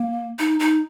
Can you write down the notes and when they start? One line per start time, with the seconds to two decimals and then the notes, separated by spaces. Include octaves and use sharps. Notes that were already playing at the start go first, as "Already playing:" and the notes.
Already playing: A#3
0.39 D#4
0.59 D#4